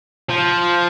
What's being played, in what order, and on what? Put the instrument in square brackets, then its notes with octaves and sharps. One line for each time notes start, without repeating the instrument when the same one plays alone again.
[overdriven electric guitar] F3